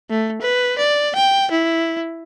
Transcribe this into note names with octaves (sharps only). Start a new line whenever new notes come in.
A3
B4
D5
G5
E4